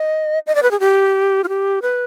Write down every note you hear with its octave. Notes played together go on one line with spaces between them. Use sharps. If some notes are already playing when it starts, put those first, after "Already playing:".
Already playing: D#5
D#5
D5
B4
G#4
G4
F4
G4
B4